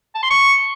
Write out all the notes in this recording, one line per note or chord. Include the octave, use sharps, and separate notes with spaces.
A5
C6
C#6